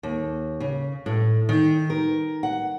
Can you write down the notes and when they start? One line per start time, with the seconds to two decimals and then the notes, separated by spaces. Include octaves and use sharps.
0.03 D#2
0.60 C#3
1.06 A2
1.49 D#3
1.90 A#4
2.43 F#5